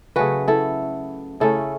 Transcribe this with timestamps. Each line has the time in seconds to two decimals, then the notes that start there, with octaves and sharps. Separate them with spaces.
0.16 C#3 F#3 A3 C#4 F#4 B4
0.48 E4 A4
1.40 C#3 A3 C#4 E4 A4